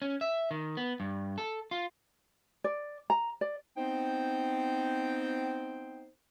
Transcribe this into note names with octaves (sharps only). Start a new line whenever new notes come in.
C#4
E5
D#3
B3
G2
A4
F4
D5
A#5
D5
B3 C4 D#4 C5 G5